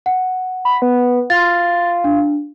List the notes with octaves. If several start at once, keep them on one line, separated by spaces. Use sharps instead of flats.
F#5
B5
B3
F4 A6
D4